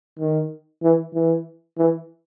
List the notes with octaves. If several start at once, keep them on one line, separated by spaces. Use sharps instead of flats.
D#3
E3
E3
E3